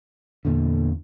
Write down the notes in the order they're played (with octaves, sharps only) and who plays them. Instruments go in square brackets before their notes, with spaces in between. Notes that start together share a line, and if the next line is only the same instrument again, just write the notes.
[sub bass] E2 [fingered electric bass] A#2 D3